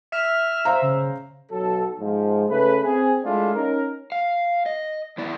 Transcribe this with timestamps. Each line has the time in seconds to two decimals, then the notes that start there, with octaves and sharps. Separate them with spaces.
0.12 E5 F6
0.65 C5 F5 A#5
0.82 C#3
1.52 B1 F#3 A4
2.00 G#2 F3
2.50 C#3 A3 B4
2.84 C4 G#4
3.24 G#3 A3 D4 E4 F4
3.55 C#4 D#4 A#4
4.12 F5
4.66 D#5
5.18 D#3 B3 E4 D5